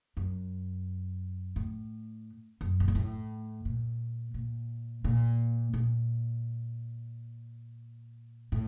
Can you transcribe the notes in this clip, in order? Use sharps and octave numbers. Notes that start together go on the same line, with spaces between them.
F#2
A2
F#2
C3
A#2
A2
A#2
A#2
A#2
A#2
A2